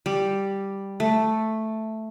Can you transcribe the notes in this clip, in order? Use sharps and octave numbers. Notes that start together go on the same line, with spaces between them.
G3
A3